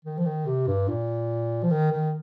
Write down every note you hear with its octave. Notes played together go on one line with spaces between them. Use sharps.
D#3
F3
D#3
C3
G2
A#2
F3
D#3
D#3